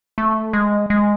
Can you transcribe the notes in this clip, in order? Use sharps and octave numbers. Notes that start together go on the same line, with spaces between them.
A3
G#3
G#3